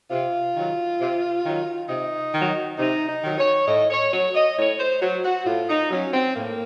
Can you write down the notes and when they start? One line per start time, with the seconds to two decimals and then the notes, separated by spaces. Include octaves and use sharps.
0.11 C3 F4
0.55 D#3 F#3
1.00 C3
1.45 D#3 F#3
1.89 C3 D#4
2.33 D#3
2.39 F#3
2.78 C3 D#4
3.09 D#4
3.23 D#3 F#3
3.38 C#5
3.68 A2 D#5
3.90 C#5
4.12 F#3 C#5
4.35 D#5
4.57 A2 C#5
4.80 C5
5.02 F#3 C5
5.24 F#4
5.46 A2 F4
5.69 D#4
5.91 F#3 C#4
6.13 C4
6.36 A2 A#3